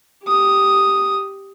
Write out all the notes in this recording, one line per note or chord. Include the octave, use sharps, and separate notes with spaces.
G4 D#6